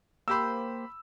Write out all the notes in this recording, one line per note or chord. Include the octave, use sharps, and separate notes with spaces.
A#3 G4 C5 B5 E6